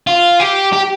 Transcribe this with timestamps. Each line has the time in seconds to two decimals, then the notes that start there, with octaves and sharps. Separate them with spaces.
0.07 F4
0.40 G4
0.73 G4